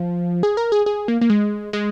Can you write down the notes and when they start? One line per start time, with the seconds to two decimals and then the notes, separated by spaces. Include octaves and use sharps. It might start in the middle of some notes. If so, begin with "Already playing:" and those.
Already playing: F3
0.43 G#4
0.57 A#4
0.72 G#4
0.86 G#4
1.08 A#3
1.21 A#3
1.30 G#3
1.73 G#3